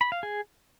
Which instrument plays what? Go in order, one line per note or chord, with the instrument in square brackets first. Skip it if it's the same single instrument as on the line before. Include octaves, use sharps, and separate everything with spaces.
[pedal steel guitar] B5
F5
G#4